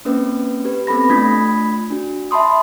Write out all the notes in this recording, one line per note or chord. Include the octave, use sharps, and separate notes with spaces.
A#3 C4 C#4 B4
G4 B4
B3 C4 A4 B5 A#6
A3 D4 F4 B5 G#6 B6
D4 F#4
E5 A5 B5 C6 D#6